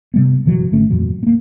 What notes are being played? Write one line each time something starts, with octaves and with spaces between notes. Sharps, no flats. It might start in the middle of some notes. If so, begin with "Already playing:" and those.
C3 G3 B3
F#1 B2 E3 F#3
G#1 D3 A3 C#4
F2 A#2 E3 F#3
A#3 B3